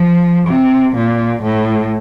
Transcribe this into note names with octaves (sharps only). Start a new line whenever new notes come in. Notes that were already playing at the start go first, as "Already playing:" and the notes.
Already playing: F3
C3
A#2
A2